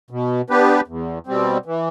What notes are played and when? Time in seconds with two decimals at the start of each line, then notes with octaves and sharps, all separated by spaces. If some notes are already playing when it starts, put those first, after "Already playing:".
0.11 B2
0.50 B3 D4 G4 B4
0.88 E2
1.27 B2 G3 C4
1.66 E3